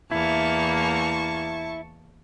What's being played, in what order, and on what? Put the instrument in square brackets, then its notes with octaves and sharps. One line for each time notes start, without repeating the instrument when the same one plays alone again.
[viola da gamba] E2 A#3 [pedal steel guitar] E4 [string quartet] A5 C#6